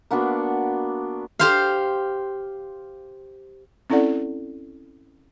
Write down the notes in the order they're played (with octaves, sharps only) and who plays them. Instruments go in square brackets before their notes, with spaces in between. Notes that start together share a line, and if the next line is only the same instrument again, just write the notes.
[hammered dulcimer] A#3 B3 D4 F#4
[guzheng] G4 C5 F5
[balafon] C4 C#4 E4 A4 D5 F#5